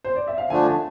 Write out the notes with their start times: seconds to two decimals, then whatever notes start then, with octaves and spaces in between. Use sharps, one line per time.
0.04 C5
0.16 D5
0.28 E5
0.38 F5
0.50 D3 F3 A3 D4 G#5
0.67 A5